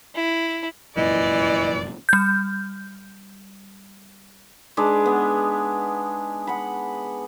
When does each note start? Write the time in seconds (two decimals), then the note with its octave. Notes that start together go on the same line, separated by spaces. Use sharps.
0.14 E4
0.97 F1 F#2 A#2 E3 D5 D#5
2.09 G3 G6
4.77 G#3 D4 D#4 B4
5.06 B3
6.47 F#5 B5